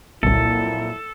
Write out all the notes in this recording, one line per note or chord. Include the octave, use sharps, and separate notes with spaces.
G1 C2 F2 A#2 F#3 E4 A4